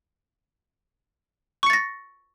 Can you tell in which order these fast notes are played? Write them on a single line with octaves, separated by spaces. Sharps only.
C#6 C#7 A6 A#6